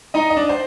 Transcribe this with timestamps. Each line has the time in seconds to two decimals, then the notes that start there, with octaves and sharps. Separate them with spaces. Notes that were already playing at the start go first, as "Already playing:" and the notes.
0.14 D#4 D#5
0.30 D#5
0.37 D4 D5
0.49 C5